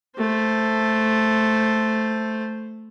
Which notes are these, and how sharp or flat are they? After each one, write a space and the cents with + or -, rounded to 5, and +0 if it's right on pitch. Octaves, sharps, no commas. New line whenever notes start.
A3 +0 C5 +0